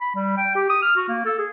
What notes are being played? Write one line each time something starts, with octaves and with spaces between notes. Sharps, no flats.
B5
G3
G5
G4
D#6
F6
F#4
A#3
A4
G#4